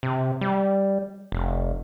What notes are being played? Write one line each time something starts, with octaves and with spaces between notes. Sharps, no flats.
C3
G3
F1